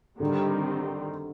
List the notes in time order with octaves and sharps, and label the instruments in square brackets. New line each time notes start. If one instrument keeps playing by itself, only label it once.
[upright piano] D3 [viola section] D#3 G3 C4